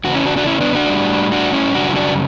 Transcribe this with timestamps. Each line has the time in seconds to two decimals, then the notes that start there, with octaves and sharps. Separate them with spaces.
0.04 E2 C#3 F#4
0.15 C#4 E4
0.26 D4 F#4
0.36 D4 F#4
0.47 C#4 E4
0.61 B3 D4
0.75 D4 F#4
0.89 A2 G3
1.32 D4 F#4
1.53 C#4 E4
1.74 F#2 C#3 G3 D4 F#4
1.90 E4
1.96 D4 F#4